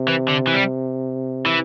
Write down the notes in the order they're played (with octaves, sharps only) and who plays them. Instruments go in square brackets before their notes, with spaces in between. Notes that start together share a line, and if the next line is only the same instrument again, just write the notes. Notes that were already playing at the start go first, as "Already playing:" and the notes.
Already playing: [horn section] C3
[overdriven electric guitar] E3
D3
E3
G3
E3